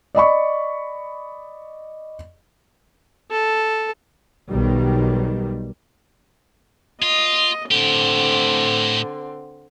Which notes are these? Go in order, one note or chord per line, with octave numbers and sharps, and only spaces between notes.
D5 D#5 B5 C#6
A4
B1 D#3 G3
F4 D#5
A2 D3 C4 G4